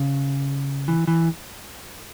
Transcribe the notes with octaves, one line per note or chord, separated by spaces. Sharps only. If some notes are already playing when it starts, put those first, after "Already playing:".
Already playing: C#3
E3
E3